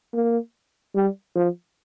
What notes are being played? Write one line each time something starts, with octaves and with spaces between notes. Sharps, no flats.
A#3
G3
F3